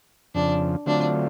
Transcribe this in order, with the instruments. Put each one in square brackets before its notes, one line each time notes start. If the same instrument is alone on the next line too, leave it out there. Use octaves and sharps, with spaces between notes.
[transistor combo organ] F2 C#3 F3 [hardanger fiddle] D4
[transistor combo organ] D3 F#3 A3 C4 F4 [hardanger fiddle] D4